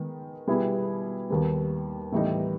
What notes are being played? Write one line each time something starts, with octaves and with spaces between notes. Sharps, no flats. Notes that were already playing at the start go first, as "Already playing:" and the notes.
Already playing: D#3 G#3 B3
B2 G3 B3 E4 G#4
D#2 D#3 G3 B3
A2 E3 G3 B3 D#4